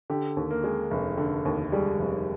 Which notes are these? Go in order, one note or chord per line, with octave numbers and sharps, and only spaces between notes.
D3 G4
D#2
A#3
G#3
F1
D3
D#2
G3 G#3
F1